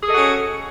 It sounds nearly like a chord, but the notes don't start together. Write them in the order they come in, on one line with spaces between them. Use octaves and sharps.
G#4 A4 D#5 F#4 C#4